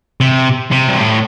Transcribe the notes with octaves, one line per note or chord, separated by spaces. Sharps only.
C3
C3
G2
A2